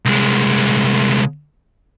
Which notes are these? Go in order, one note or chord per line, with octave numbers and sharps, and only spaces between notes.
C2 G#3